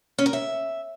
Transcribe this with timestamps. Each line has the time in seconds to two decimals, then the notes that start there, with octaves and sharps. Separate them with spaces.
0.18 C#4
0.26 A#4
0.33 E5